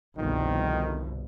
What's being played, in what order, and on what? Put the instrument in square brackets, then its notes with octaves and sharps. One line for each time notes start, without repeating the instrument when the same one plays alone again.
[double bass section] G1 C2 B2 [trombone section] F2 D#3